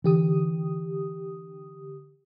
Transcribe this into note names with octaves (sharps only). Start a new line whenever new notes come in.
D3 E3 G4 D#6